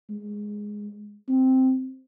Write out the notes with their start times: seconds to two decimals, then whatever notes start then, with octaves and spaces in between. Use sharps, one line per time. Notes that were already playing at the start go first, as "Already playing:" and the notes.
0.09 G#3
1.29 C4